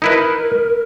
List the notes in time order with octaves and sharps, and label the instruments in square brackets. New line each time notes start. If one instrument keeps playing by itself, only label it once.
[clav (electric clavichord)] D#4 E4 B4 [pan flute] A#4